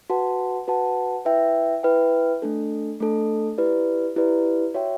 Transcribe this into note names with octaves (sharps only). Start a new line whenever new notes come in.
F#4 B4 F#5 A5
F#4 B4 F#5 A5
E4 B4 E5 G5
E4 B4 E5 G5
A3 D4 A4
A3 D4 A4
E4 G4 B4 D5
E4 G4 B4 D5
F#4 C#5 E5 G5